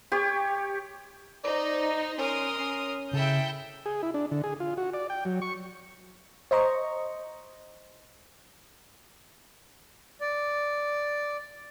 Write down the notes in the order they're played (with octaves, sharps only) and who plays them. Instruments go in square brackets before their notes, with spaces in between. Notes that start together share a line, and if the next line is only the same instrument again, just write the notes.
[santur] G4 C#5
[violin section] D#4 C5 [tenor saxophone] D5
[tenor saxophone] C#4 [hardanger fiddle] A#4 [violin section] C6 D#6
[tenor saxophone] C#4
[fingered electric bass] C#3 [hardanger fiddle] E4 A4 [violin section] G5 G6
[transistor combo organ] G#4
E4
D4
D3
G#4
F4
F#4
D5
G5
F#3
C#6
[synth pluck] C5 D#5 A#5 C#6
[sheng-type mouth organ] D5